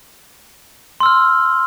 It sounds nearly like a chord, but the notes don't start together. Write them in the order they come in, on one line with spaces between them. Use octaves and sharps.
C6 E6 F6